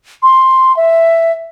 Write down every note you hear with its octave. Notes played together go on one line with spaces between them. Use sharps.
C6
E5